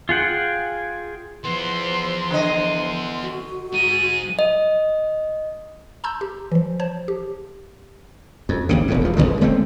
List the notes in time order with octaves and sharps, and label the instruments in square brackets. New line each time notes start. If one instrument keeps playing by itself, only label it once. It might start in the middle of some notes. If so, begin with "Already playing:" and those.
[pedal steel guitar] F4 G#4 F#5 G5
[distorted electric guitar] E3 B3 [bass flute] F3 [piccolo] C6
[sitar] D3 D#5
[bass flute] F#4
[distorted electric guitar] G#2 G#4 [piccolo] D#7
[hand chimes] D#5
[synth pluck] A5 A#5 C6 E6 G6
G4
E3 F3
C5 C#5 A5
G4
[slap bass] F2
G#1 D#2 C#3
E1 E2 G#2
E2 F3
F1 D#2 D3 G#3
D#1 G#3 A3 C4